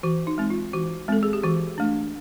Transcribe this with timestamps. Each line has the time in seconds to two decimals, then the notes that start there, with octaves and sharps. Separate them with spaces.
0.03 E3 F#4
0.27 D#4
0.38 G#3 C4
0.50 F4
0.73 E3 F#4
1.08 G#3 C4 A4
1.23 G#4
1.33 G4
1.44 E3 F#4
1.78 A3 D4